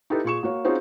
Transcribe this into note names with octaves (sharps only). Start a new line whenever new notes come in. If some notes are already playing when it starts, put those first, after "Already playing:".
D#4 E4 G4 A4 B4
A#2 G#4 C#6 E7
A#3 F#4 C#5
C4 C#4 D#4 F4 F#4 G#4